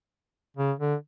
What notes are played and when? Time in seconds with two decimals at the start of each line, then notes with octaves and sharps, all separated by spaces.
0.57 C#3
0.79 D3